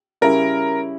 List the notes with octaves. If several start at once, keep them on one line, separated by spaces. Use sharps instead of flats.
C#3 G3 C#4 E4 A#4